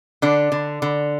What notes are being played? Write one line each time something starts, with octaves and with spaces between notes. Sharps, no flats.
D3 D4
D3
D3